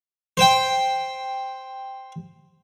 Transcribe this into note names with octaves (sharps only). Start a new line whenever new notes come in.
C5 G5